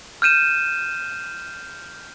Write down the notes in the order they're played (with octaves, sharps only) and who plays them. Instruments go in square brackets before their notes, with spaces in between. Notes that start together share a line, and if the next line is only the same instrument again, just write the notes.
[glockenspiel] F6 G6 D#7 E7